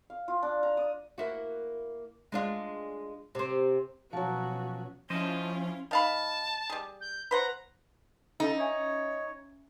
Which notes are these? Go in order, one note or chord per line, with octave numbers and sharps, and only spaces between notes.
F5
F4
D4
A#5
D#6
A#3 E4 F#4
G#3 D4 F4
C3 C4
B2 F3 F#3 C#4 F#4
F3 C#4 E4 F4 C5 D#5
D#3 F5 A5 B5
G3 G#4
G6
B4 C5 F#5 A#5
C#4 D#4 A4 F5
C#5 D5 E5 G#5